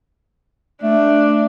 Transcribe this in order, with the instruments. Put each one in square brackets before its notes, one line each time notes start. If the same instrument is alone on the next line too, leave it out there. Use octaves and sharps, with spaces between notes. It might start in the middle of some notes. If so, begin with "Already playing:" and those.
[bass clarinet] A3 [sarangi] D4